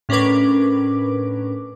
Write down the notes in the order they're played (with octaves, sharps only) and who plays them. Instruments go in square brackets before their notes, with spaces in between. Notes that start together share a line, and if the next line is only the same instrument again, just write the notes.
[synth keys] A2 C#4 D4 A#4 B4 D6